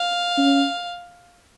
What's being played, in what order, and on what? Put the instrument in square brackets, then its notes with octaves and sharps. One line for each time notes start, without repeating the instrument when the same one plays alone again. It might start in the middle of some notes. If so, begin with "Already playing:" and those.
Already playing: [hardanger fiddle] F5
[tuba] C#4